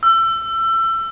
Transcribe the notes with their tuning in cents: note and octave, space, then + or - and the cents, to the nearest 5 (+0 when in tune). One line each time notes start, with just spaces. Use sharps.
E6 +30